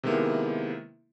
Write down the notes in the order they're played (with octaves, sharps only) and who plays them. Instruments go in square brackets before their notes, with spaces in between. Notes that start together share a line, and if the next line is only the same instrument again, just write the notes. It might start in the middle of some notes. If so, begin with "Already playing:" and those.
[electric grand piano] C3 D#3 G#3 A#3 B3 E4